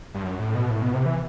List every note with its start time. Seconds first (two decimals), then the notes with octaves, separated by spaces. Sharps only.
0.14 G2
0.24 F#2
0.39 A2
0.55 B2
0.70 A2
0.82 B2
0.94 C3
1.06 E3